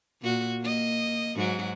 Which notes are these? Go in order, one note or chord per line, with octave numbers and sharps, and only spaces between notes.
A#2 F#4
A#3 D#5
G#2 F#3 F#4